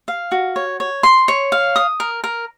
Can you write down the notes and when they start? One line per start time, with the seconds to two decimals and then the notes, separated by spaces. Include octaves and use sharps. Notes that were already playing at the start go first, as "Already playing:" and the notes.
0.08 F5
0.32 F#4
0.56 C#5
0.80 C#5
1.03 C6
1.28 C#5
1.52 F5
1.76 D#6
2.00 A#4
2.24 A#4